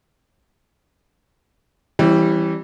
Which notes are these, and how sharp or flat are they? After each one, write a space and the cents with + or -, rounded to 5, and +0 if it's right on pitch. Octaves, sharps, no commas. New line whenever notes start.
E3 +0 G3 +0 C#4 -45